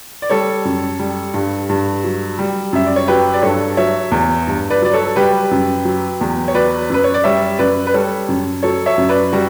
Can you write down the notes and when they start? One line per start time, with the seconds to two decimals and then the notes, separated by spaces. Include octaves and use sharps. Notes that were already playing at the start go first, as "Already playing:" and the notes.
0.22 D5
0.30 G3 A4 C#5
0.65 F#2
1.00 G3
1.34 G2
1.69 G2
2.04 F#3
2.39 G3
2.73 F#2 E5
2.86 D5
2.96 C#5
3.08 F#3 G4 B4
3.34 D5
3.42 G2 A4 C#5
3.77 F#3 C#5 E5
4.12 E2
4.47 G2
4.70 B4 D5
4.82 F#3 D5
4.93 A4 C#5
5.06 A4
5.16 G3 G4 B4
5.51 F#2
5.85 F#3
6.21 E2
6.48 C#5
6.54 F#3 B4 D5
6.90 F#2 B4
7.04 C#5
7.14 D5
7.24 G3 C#5 E5
7.59 F#2 B4 D5
7.87 B4
7.94 G3 A4 C#5
8.29 F#2
8.63 F#3 A4 C#5
8.86 C#5 E5
8.98 F#2
9.09 B4 D5
9.32 G3 F#4